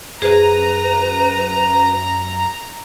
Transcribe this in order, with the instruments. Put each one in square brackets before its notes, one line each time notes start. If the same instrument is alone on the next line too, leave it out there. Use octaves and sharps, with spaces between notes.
[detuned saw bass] F#2 [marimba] G#4 C5 [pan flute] B4 [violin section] A#5